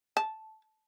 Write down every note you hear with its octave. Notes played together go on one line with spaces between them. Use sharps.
A5